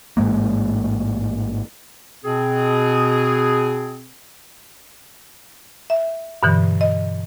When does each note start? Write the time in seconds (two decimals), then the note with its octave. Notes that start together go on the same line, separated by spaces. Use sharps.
0.17 A1 G#2 G#3 A#3
2.25 B2 C4 G#4
5.90 E5
6.43 G2 B2 D3 E3
6.81 D#5